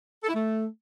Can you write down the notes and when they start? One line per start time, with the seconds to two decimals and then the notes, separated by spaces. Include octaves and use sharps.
0.23 A4
0.28 E4
0.34 A3